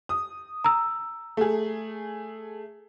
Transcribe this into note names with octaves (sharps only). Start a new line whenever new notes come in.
D#6
A#5 E6
A3 G#4